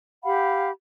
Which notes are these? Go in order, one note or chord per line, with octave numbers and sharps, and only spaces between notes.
G4 F5 F#5 B5